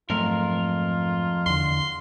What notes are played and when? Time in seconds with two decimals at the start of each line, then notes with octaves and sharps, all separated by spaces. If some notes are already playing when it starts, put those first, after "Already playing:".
0.10 F2 G#2 F#3 A3 F4 A#4
1.46 E2 D3 C6